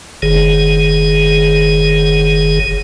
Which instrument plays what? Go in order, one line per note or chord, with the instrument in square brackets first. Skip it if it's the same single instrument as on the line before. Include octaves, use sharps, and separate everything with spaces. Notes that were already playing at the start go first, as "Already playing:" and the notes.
[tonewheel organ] F#1 D#3 G#4